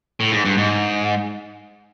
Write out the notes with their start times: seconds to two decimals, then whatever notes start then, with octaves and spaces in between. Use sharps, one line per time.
0.20 A2
0.32 G#2
0.45 G2
0.57 G#2